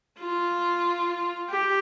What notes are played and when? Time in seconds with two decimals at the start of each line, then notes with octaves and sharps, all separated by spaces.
0.19 F4
1.50 G4